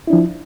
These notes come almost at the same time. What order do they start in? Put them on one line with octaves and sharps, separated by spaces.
E4 D4 F3